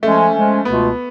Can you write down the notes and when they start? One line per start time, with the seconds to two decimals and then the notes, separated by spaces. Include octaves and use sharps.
0.03 F3 G#3 A3 C#4
0.33 F3 G#3 C#4
0.65 C#2 B2 A3 B3 F4